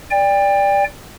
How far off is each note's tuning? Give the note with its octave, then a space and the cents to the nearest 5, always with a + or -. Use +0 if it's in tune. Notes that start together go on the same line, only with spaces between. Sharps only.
D5 -5 G5 +30